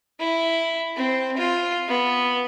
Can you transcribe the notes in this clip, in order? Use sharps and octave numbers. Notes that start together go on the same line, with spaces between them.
E4
C4
F4
B3